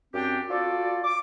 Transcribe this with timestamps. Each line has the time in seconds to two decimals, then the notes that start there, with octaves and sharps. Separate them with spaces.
0.14 F#2 C4 D4 G4 G5
0.49 F4 F#4 A4 D5
1.04 D6